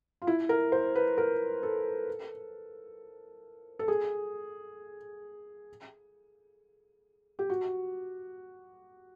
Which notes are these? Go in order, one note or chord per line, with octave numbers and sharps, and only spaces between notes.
F4
E4
A#4
C5
B4
A#4
A4
A4
G#4
G4
F#4